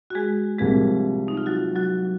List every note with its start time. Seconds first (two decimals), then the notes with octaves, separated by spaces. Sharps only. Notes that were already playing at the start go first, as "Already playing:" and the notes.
0.10 F#4
0.15 G#3 G#4
0.59 C2 C3 F3 G#3 A#3 G#4
1.28 D#4
1.37 F4
1.46 F#3 F#4
1.75 F#3 F#4